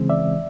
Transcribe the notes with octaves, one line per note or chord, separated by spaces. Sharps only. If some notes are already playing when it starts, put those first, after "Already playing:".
Already playing: C#3 E3 G#3 C4
D5 E5